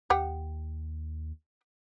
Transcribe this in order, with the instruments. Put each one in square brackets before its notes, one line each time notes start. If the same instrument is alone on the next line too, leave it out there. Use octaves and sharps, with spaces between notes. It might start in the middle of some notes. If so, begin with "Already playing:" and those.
[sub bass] D#2 [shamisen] G4 F#5 G5